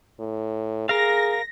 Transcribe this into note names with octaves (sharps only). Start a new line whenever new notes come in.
A2
G#4 A#4 F5 A#6